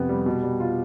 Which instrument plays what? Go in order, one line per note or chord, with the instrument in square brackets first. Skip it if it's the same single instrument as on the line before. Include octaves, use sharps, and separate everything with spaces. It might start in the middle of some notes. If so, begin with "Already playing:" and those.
Already playing: [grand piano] F2 C3 B3
G3
B2
G3
F4